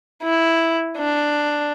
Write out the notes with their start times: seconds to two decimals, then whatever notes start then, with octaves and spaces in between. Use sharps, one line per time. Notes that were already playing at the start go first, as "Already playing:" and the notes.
0.23 E4
0.98 D4